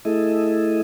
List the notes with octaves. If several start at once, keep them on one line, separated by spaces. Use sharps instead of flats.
A3 E4 G#4 A4 D#5 E5